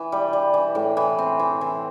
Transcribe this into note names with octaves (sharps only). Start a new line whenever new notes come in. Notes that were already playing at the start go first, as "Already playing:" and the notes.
Already playing: E3
G3
G3
E3
A2
E3
C4
E3
E3